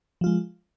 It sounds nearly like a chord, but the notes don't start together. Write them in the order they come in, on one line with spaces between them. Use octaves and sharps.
F3 F4 G#3